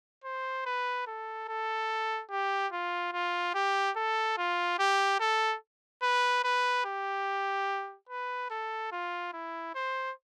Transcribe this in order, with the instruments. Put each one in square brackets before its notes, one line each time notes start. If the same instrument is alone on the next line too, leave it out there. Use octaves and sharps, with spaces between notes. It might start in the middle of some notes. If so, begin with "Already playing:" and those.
[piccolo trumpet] C5
B4
A4
A4
G4
F4
F4
G4
A4
F4
G4
A4
B4
B4
G4
B4
A4
F4
E4
C5